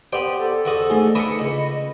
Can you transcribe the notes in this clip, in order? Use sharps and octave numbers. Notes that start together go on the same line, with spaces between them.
B3 G4 C5 D5 G5
A4
E2 F#4 D#5
A3 D#4 G#4
E3 D4 D#5 B5 C#7
C#2 D#5